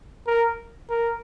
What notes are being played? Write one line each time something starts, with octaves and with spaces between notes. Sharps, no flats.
A#4
A#4